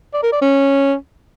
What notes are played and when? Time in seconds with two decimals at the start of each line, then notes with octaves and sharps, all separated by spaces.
0.13 D5
0.23 A#4
0.32 D5
0.42 C#4